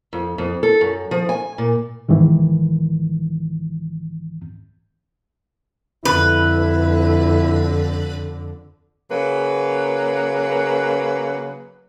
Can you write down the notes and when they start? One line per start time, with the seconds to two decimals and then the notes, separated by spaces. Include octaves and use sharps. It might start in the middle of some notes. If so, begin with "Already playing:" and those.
0.13 F2
0.38 F2
0.63 A4
0.81 F#2
1.11 F3
1.29 G#5
1.58 A#2
2.08 C2 G#2 D#3 E3
6.05 F2 D3 E4 B4
9.10 C#3 F#3 A#3 B4